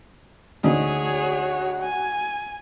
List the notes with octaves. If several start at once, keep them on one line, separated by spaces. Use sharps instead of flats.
D2 D#4 F#4 G#4 C#5
G#5